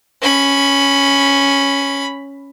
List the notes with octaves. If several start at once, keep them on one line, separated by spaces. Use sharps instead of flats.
C#4 B5